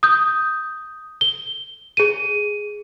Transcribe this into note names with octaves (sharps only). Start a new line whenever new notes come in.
D#6 G6
G7
G#4 D#7